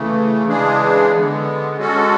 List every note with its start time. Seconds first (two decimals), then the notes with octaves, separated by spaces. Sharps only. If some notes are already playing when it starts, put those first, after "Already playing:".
Already playing: C#3 E3 A3
0.46 C#3 E3 G#3 D4 G#4
1.12 D3 G#3 B3
1.77 G#3 C#4 F#4 A4